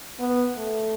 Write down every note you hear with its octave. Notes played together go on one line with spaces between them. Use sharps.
B3
A3